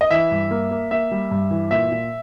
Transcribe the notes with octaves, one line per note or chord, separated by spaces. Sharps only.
D#5
E3 E5
G2
A#3
A#3
A#3 E5
G3
G2
E3
A#2 E5
A#2